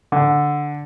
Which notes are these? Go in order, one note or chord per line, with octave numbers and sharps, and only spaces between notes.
D3